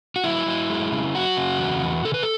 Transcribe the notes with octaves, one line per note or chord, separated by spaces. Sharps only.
F#4
F#3 E4
F#3
G#3
C#3
F#3 F#4
C#3
E2
E2
C#3 A4
B4
A4